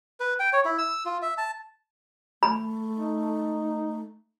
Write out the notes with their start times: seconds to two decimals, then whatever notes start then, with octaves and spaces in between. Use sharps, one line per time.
0.20 B4
0.40 G5
0.53 C#5
0.65 E4
0.78 E6
1.05 F4
1.22 E5
1.38 A5
2.43 A3 B5
2.96 D#4